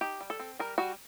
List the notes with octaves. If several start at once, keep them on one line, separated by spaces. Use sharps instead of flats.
D#4 G4
G3
A4
C4
G3 A#4
G3 F#4